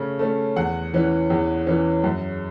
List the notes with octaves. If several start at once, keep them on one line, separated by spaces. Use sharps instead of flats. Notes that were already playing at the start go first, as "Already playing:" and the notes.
Already playing: C#3 A3 C#4
A3 C#4
E2 F#5
E3 C#4
E2
E3 C#4
F#2